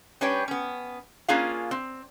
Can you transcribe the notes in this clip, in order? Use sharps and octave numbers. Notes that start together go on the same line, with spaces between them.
G3 C#4 D4 B4 C#5 G5
B3 C#4
A#3 C#4 D4 F4 G#4 F5
C4